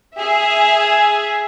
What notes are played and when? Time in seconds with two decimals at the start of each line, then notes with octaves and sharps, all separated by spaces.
0.16 G#4 E5